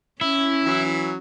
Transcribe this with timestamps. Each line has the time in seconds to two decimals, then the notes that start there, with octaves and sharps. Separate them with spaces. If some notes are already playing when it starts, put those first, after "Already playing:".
0.21 C#4 E4
0.64 E3 F#3